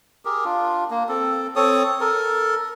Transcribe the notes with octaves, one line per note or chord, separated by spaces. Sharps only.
G4 G#4 A#4
D4 F4
A#3
C4 A4
C4 A4 C#5 D#6
A4 A#4